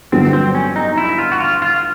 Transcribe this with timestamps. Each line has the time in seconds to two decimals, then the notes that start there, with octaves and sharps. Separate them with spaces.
0.12 G1 G2 D3 F#3 B3 C4
0.33 C4
0.55 C#4
0.76 D#4
0.98 E4
1.18 F4
1.32 F#4
1.40 F4
1.62 F4